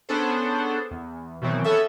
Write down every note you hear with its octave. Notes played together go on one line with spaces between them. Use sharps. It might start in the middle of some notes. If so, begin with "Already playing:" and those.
B3 C#4 D4 G#4 A4 C5
E2
B2 D#3 E3 F#3 C4
B3 C#4 G#4 A4 E5